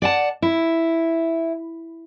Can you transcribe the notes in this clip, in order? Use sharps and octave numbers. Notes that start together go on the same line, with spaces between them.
D5 F#5 A5
E4